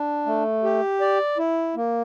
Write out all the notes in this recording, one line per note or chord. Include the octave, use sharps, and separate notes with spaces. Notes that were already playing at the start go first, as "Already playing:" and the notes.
Already playing: D4
A3
G4
D5
E4
A#3